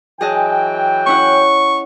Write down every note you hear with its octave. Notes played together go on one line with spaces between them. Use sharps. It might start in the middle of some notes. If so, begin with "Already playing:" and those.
E3 F#3 G#4 D#5 G5 A5
C#4 E4 F#5 C#6